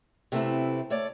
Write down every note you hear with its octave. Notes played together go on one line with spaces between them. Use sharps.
C3 A3 B3 C4 E4
A3 C#5 D5